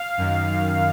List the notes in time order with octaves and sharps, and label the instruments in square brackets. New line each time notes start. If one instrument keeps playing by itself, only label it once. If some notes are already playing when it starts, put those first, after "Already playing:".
Already playing: [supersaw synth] F5
F#2 D#3